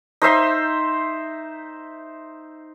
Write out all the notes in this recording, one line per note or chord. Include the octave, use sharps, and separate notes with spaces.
D#4 C5 E5 C6